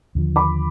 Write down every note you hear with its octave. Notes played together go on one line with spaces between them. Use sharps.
D#2 D3 F3
B5 D6